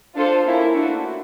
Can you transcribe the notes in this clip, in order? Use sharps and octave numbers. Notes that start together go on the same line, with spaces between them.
D4 F4 A4 C5
A#3 C#4 E4
A3 D4 F#4